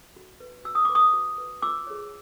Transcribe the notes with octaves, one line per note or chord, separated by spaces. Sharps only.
F#4
B4
F#4 E6
D#6
B4 D6
C#6 D#6
F#4
B4
F4 D6 E6
G#4 C#5